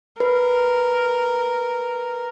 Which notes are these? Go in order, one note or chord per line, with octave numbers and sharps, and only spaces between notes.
A#4 B4